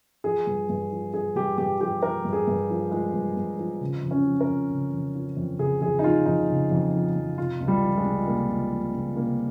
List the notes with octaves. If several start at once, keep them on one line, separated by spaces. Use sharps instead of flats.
F3 G#4
G2
G2
F3
F3 G#4
G2 G4
G2 G4
F3 G4
F3 A#4
G2
G#4
G2
F3
F3 G#3
G2
G2
F3
C#3
F2
C#4
F3
A#4
F2
C#3
F2
F3
F2
C#3 G#4
F2 G#4
D#4
F3 F4
F2 D#4
C#3
F2
F3
F2
C3 F4
C#2
G3
F3
G#3
C#2
C3 A#3
C#2
F3
C#2
C3 A#3